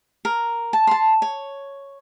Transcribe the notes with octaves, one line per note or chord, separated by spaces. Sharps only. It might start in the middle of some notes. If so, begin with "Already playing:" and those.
A#4
A5
A5 C6
C#5